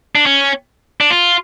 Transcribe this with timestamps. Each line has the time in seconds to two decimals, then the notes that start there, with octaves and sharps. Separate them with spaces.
0.15 D4
0.26 C#4
1.01 D4
1.11 F4